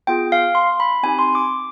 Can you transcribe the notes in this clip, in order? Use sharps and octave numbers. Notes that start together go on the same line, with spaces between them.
B3 F4 G#4 G5
F5
C6
B5
C4 D#4 G4 G#5
C6
D6